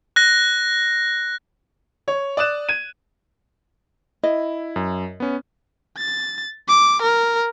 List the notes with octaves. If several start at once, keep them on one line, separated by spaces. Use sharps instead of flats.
F#6 A#6
C#5
D5 D#6 F#6 E7
G#6 D#7
E4 D#5
F#2
B3 C#4
A6
D6
A#4